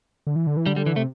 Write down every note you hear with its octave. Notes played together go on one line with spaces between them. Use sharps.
D3
E3
D3
E3
D3 G3
G3
E3
C3 A3